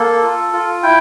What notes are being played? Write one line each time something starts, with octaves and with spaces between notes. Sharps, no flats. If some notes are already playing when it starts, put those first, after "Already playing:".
Already playing: A#3 A4
F4
F4
E4 G5